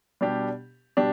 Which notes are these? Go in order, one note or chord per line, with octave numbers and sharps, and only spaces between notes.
B2 G3 D4 G4
B2 G3 D4 G4